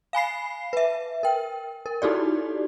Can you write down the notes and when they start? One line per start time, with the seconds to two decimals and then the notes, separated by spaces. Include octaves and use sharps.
0.13 F5 G#5 B5 C7
0.73 B4 E5
1.23 A#4 G5
1.86 A#4
2.02 D#4 E4 F#4 G4 A4 D5